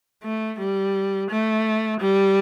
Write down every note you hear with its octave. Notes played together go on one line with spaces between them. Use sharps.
A3
G3
A3
G3